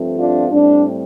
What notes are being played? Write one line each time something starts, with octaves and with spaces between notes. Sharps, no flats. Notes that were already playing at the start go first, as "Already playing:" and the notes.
Already playing: G2 F3 A3 C4
D4 F4
A2 G3 C4 D4